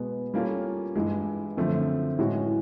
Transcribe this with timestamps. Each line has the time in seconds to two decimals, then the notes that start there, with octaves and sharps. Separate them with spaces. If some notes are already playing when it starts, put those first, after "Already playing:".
Already playing: B2 G#3 B3
0.34 G3 A#3 C#4 F4 A4
0.96 G2 E3 G#3
1.57 F#2 D3 F3 A3 C4
2.19 A2 E3 G#3 C#4 F#4